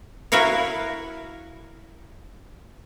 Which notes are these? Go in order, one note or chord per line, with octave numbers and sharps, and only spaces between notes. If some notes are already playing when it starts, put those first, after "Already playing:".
E4 F#4 A#4 C#5 F5